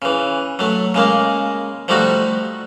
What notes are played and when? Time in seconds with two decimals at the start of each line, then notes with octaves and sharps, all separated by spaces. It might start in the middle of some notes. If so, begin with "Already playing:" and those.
0.02 C#3 E3
0.59 F#3 A3
0.94 C#3 G#3 A#3
1.88 F3 G3 A3 D#4 F#4